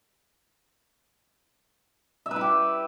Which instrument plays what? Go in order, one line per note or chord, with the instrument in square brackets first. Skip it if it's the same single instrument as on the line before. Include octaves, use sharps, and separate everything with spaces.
[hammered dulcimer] E5
B4
E4
G4